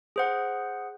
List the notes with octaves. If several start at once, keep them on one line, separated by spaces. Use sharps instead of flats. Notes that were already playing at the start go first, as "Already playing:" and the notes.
G#4 C5 F#5